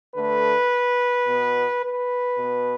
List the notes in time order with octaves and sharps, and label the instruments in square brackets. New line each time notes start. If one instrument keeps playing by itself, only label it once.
[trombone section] D3 A3 B4
B2 B3
B4
B2 B3